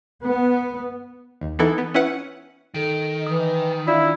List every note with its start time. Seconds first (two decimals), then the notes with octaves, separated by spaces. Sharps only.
0.23 B3
1.41 D#2
1.59 E3 B3 D#4 E4 A4
1.78 B3
1.94 C#4 E4 B4 F#5
2.74 D#3 A4 D7
3.26 E3 D#6
3.87 D4 E4 F4 D5 B6